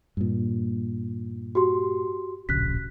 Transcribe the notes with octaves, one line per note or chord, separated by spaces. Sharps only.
G2 A#2
F#4 G4 C6
D1 A#1 C#3 F#6 B6